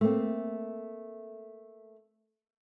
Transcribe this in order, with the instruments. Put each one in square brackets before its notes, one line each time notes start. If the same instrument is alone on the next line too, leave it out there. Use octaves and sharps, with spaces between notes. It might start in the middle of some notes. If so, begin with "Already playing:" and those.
[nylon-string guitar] A3 A#3 C4